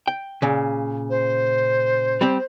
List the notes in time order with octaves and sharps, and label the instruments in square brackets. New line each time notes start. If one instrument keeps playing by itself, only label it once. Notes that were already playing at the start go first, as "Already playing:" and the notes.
[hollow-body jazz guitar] G5
A#2 C#3
[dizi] C5
[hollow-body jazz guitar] G3 C4 G4